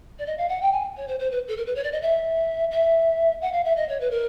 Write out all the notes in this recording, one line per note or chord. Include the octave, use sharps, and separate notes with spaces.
D5
D#5
F5
F#5
G5
G#5
C#5
C5
C5
B4
A4
A#4
B4
C#5
D5
D#5
E5
E5
F#5
F5
E5
D#5
C#5
B4
A#4